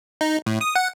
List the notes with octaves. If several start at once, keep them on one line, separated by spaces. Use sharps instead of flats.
D#4
A2
D#6
F#5